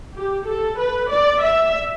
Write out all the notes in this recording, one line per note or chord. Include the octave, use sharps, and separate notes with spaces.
G4
A4
B4
D5
E5